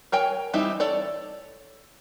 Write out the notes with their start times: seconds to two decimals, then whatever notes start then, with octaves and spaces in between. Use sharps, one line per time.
0.12 A#4 C#5 G5 G#5
0.53 E3 G3 C4 D#4 E4
0.80 A4 C#5 D5